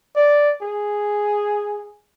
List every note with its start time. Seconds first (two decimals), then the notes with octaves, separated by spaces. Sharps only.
0.15 D5
0.62 G#4